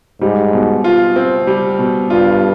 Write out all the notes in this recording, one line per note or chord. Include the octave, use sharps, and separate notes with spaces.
G#2 G3
B2
F4
C4
G3
B2
G2 F4